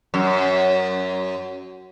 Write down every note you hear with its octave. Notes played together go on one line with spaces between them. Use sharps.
F#2